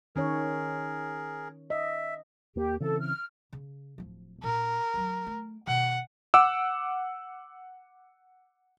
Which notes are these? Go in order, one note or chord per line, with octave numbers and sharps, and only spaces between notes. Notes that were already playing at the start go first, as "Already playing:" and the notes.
D#3 C#4 G#4 A#4 C#5
D#5 E5
D#2 A#3 G4
C#3 E3 C4 A4
F6
C#3
D1 F3
A#2 C#4 A#4
D2 F#3
A3
B2 D#3 F#5
F#5 D6 E6